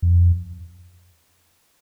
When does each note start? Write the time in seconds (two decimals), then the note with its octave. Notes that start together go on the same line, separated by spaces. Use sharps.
0.02 F2